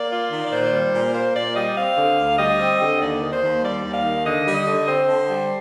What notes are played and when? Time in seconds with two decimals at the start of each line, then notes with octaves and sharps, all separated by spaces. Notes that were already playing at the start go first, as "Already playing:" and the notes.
Already playing: A#3 D5
0.11 F4
0.32 D#3
0.45 D5
0.51 A#2 C5
0.73 G3
0.93 A#2
1.14 A#3 C5
1.35 A#2 D5
1.56 G3 D#5
1.76 C4 F5
1.98 D3
2.18 D2
2.38 G3 D#5
2.60 C4
2.81 D3
3.00 D#2 D5
3.22 D#3
3.32 C5
3.43 D#2
3.63 G3 D5
3.84 D#2
3.94 F5
4.05 D#3
4.25 D3 D#5
4.46 G3
4.56 D#5
4.67 D3
4.88 C4 C5
5.08 D3
5.28 G3